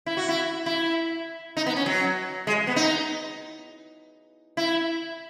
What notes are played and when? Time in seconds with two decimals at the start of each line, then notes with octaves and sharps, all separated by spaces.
0.06 E4
0.17 F#4
0.28 E4
0.66 E4
1.57 D#4
1.66 B3
1.77 C#4
1.86 F#3
2.47 G#3
2.67 B3
2.76 D#4
4.57 E4